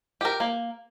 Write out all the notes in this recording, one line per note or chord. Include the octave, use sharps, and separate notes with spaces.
G4 A#4
A#3